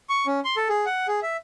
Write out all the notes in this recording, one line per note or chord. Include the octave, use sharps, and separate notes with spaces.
C#6
C#4
C6
A4
G#4
F#5
G#4
E5